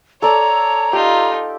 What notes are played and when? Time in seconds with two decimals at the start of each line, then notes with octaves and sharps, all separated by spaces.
0.22 A4 C#5 D5 A#5
0.93 D#4 F4 G4